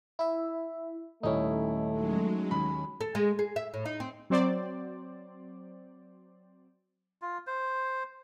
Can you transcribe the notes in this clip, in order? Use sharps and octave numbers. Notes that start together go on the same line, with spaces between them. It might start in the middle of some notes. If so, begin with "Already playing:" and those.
E4 E5
D#1 A3 C#4 D#4 E4
F#3 G#3
D#2 C#4 B5
A4
G#3
G#4
E5
A2
D#4
C4
F#3 C4 C5 D5
F4
C5